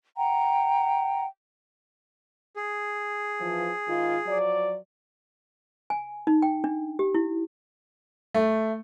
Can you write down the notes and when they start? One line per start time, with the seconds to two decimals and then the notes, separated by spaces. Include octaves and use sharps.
0.17 F#5 G5 A#5
2.56 G#4
3.40 E3 F3
3.88 G#2 D#3 F4
4.27 F3 F#3 D5
5.90 G#5
6.27 D#4
6.42 G5
6.64 D4
6.99 G4
7.14 E4
8.34 A3